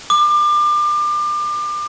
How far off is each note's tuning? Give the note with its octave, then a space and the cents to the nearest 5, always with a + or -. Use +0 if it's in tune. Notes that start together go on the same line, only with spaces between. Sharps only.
D6 +30